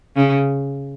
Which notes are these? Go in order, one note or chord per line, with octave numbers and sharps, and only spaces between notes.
C#3